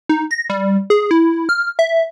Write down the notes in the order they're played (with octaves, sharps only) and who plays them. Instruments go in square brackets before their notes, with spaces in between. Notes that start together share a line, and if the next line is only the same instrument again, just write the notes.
[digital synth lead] D#4
A#6
G3
G#4
E4
F6
E5